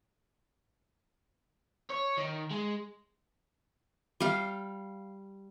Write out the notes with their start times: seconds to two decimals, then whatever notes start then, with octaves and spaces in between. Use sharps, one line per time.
1.90 C#5
2.17 D#3
2.51 G#3
4.20 G3 F5